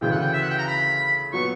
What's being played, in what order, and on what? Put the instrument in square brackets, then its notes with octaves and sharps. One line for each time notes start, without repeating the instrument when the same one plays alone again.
[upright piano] D2 C#3 E3 [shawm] G5
[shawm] F#5
G5
E5
F#5
G5
A#5
B5
[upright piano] A#2 F#3 B3 [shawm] C#6